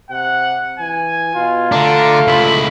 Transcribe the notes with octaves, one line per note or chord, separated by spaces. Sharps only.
C3 F#5
E3 G#5
B2 F4
D3 A3 D4 A#5
C#2 E4 B5